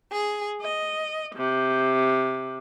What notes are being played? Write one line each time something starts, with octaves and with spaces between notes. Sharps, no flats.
G#4
D#5
C3